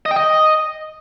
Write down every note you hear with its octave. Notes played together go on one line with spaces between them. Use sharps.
D#5
G5
D#5